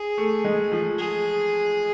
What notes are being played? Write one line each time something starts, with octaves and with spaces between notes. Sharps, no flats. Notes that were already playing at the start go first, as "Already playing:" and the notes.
Already playing: G#4
A3
G#3
F3
G#4